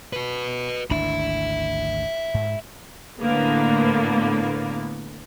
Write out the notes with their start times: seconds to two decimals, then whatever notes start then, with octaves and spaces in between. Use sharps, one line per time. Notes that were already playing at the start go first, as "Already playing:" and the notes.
0.13 F#4 B4
0.91 G#1 D2 D4 E5 B5
2.34 G#2
3.20 A2 D3 A#3 B3